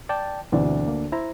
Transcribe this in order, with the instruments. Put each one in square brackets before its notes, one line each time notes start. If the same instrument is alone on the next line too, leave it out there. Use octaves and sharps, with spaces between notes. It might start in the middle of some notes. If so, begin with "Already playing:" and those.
[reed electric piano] D5 G5 A5
[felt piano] D2 D4 D5 [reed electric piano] B2 E3 C4
[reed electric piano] A#3
E4 C5 A#5